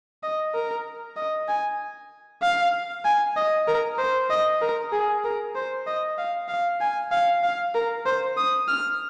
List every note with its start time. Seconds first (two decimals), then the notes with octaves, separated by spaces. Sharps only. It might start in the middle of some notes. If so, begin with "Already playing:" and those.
0.23 D#5
0.55 A#4
1.17 D#5
1.48 G#5
2.42 F5
3.05 G#5
3.37 D#5
3.68 A#4
3.98 C5
4.30 D#5
4.61 A#4
4.93 G#4
5.24 A#4
5.55 C5
5.87 D#5
6.18 F5
6.49 F5
6.81 G#5
7.12 F5
7.43 F5
7.75 A#4
8.06 C5
8.37 D#6
8.68 F6